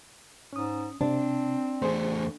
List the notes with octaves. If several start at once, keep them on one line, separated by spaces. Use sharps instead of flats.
G#2 C#4 D#6
C3 C4 D4
E2 A3 G#4 C5